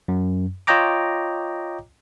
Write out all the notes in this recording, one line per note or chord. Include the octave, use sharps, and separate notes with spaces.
F#2
F4 C#5 D#5 G5 A#5 D6